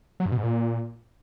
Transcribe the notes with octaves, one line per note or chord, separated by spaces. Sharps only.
F#3
G2
B2
G#2
A#2